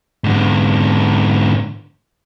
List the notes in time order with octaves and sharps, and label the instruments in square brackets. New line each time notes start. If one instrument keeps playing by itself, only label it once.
[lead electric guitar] G#2 D3